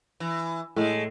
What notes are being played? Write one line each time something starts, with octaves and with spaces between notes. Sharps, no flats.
E3
A2 G#3 A3